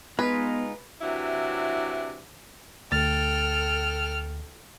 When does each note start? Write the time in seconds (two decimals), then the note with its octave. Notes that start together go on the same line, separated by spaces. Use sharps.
0.19 G#3 B3 D#4 F4 B4
1.01 C3 E3 F#3 D4 E4
2.92 D2 A4 G5 F6 A6